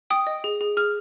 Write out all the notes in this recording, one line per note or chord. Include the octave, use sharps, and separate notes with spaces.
G5 D#6
D#5
G#4
G#4
G#4 F6